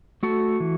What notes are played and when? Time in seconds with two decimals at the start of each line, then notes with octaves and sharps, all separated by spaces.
0.23 A3 F#4 A4
0.60 E3